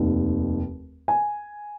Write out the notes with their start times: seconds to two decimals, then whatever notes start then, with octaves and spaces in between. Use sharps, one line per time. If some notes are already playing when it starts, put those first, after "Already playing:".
Already playing: F1 D#2 D#3
1.08 G#5